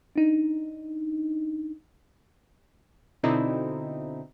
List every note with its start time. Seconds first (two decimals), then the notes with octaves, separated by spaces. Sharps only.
0.16 D4 D#4
3.23 B2 D3 C4 D#4 E4